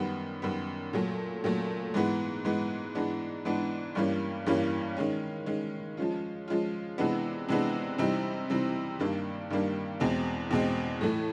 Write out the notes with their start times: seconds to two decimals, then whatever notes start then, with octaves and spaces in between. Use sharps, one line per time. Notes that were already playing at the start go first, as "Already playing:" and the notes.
Already playing: F#2 D#3 G3 B3
0.42 F#2 D#3 G3 B3
0.93 A#2 F#3 A3
1.44 A#2 F#3 A3
1.94 G#2 E3 G#3 B3
2.45 G#2 E3 G#3 B3
2.95 G#2 E3 G#3 B3 D4
3.45 G#2 E3 G#3 B3 D4
3.95 G2 E3 G3 A#3 C#4
4.46 G2 E3 G3 A#3 C#4
4.97 D#3 G#3 C#4
5.46 D#3 G#3 C#4
5.97 F3 G#3 C#4 F4
6.48 F3 G#3 C#4 F4
6.98 C3 E3 G#3 B3 D4
7.49 C3 E3 G#3 B3 D4
7.98 C3 E3 G3 C4 D#4
8.49 C3 E3 G3 C4 D#4
8.99 G2 D#3 G3 A#3 D4
9.50 G2 D#3 G3 A#3 D4
10.00 E2 B2 G#3 C4
10.51 E2 B2 G#3 C4
11.01 A2 E3 A3